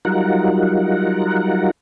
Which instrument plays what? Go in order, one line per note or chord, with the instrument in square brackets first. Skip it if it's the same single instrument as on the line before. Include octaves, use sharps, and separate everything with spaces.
[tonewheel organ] F#3 G3 D#4 F4 A#4 F#5